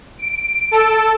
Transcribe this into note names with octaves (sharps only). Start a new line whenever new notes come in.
D7
A4